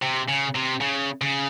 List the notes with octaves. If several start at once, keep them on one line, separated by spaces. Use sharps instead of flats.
C3
C#3
C3
C#3
C#3